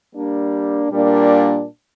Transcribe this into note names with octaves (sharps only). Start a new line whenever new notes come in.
G3 A#3 D4
A#2 G3 A#3 D4